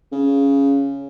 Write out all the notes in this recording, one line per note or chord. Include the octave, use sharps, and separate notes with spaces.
C#3